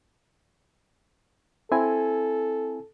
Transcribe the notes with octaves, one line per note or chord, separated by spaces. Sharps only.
C4 E4 A4 G#5